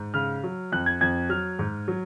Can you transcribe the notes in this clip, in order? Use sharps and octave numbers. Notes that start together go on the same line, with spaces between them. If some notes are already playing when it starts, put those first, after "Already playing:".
Already playing: G#2
C#3 F6
F#3
F2 F#6
G#6
F2 G#6
F#3 F6
G#2
F#3